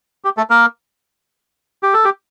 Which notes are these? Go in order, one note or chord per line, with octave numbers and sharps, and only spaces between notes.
G4
A3 A4
A#3 A#4
G4
A4
G4